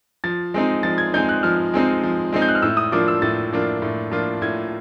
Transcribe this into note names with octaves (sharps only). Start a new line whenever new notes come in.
F3 A6
G#3 C4 D#4
F3 A6
G#6
G#3 C4 D#4 G6
F#6
F3 F6
G#3 C4 D#4
F3
G#3 C4 D#4
G6
F#6
F6
A2 E6
D#6
F3 A#3 D4 F4 D6
E6
A2 A6
F3 A#3 D4 F4
A2
F3 A#3 D4 F4
A2 G#6